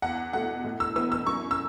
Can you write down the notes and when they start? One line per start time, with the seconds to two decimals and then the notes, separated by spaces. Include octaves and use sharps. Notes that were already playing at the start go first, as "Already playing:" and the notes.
0.02 E2 F#5
0.33 B2 A3 F#5
0.64 A2
0.80 E6
0.96 E3 B3 E6
1.12 E6
1.27 F#2 C#6
1.51 E6